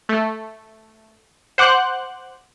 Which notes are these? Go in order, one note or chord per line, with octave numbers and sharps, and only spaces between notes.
A3
C5 F#5 D6 F#6